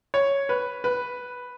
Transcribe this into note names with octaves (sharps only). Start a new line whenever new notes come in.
C#5
B4
B4